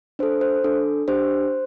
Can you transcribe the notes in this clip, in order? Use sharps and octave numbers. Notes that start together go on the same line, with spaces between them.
D4 A4 C5
C5
D4 A4
D4 G4 C5